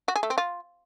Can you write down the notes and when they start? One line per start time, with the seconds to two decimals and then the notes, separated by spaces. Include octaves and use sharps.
0.08 F#4
0.16 G#4
0.23 A3
0.30 C4
0.38 F4